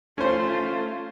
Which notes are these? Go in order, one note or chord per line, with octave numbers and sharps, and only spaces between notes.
A3 C#4 F4 C5